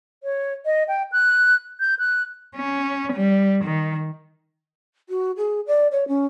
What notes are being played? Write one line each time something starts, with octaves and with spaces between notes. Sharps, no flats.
C#5
D#5
G5
F#6
G6
F#6
C#4
G3
D#3
F#4
G#4
D5
C#5
C#4